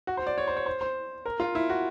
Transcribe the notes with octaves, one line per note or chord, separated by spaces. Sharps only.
F#4
C5
D5
C#5
C5
C#5
C5
C5
A#4
F4
E4
F#4